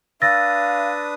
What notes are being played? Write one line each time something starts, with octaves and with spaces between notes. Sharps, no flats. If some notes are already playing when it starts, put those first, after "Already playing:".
D4 B4 F5 D#6 E6 A6 A#6